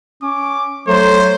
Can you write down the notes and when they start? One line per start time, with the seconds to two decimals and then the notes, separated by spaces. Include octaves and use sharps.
0.22 C#4 D6
0.88 F#3 A3 C5